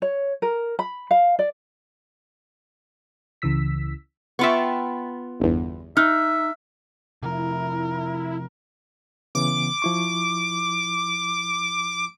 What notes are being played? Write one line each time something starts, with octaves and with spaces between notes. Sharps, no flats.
C#5
A#4
B5
F5
D5
C#2 C#3 E3 E6 B6
B3 F4 E5 G5 C#6
G1 E2
D#4 E5 F6 F#6
C3 F3 E4 A#4
C#3 E3 B3 D6
F3 E4 C#6